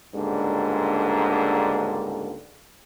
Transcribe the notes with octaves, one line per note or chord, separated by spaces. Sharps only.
C#2 G#2 D3 G3 A#3 D4